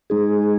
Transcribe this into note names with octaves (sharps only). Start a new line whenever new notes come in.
G#3 D#4 G#4